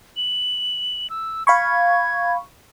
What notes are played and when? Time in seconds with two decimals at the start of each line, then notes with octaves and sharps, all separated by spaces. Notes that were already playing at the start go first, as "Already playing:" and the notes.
0.17 F#7
1.10 E6
1.47 F5 B5 C#6 G#6